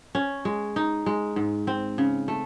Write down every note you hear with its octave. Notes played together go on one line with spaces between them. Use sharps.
C#4
G#3
D#4
G#3
G#2
C4
C#3
A3